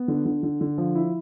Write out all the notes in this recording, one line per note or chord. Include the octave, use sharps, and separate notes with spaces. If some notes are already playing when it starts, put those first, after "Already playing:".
Already playing: B3
D3
D3
D3
D3
F3
E4